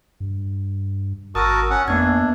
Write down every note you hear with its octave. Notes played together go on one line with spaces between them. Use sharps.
G2
G#1 F#4 A#4 A5 D#6 E6
C#4 F#5
F2 A#3 B3 D4 G#6